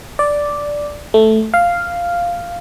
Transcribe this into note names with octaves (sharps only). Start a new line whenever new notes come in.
D5
A3
F5